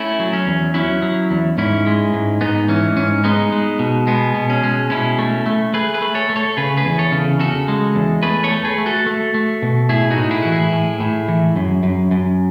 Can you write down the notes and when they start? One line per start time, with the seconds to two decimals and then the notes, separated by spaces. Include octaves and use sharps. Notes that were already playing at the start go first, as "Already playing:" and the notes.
Already playing: A3 C#4 E4
0.20 F#3
0.33 C#4
0.47 E2
0.74 F#3 C#4 E4
1.02 F#3
1.31 E2
1.58 G#2 C#4 E4
1.86 G#3
2.13 G#2
2.41 G#2 B3 D#4
2.69 E3 C#4
2.96 G#2 C#4
3.24 G#3 B3 D#4
3.52 G#3
3.79 B2
4.07 G#3 B3
4.35 B2
4.50 C#4
4.64 G#3
4.90 B2 C#4 E4
5.19 A3
5.46 A3
5.74 A3 G#4 B4
5.94 G#4 B4
6.02 A3
6.15 A4 C#5
6.30 A3
6.36 A4 C#5
6.57 C#3 G#4 B4
6.77 G#4 B4
6.85 E2
6.98 A4 C#5
7.12 C#3
7.39 C#3 F#4 A4
7.68 G#3
7.95 E2
8.23 A3 G#4 B4
8.44 A4 C#5
8.52 A3
8.64 G#4 B4
8.78 A3
8.86 F#4 A4
9.06 A3
9.34 A3
9.62 B2
9.89 A2 E4 G#4
10.10 D#4 F#4
10.17 A2
10.31 E4 G#4
10.43 E3 F#4
10.52 E4 G#4
10.73 A2
11.00 A2
11.29 E3
11.56 F#2
11.83 F#2
12.11 F#2